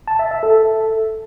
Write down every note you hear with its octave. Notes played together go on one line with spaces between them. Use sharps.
A5
E5
E5
A4